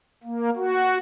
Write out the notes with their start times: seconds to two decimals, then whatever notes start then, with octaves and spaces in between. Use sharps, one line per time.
0.23 A#3
0.56 F#4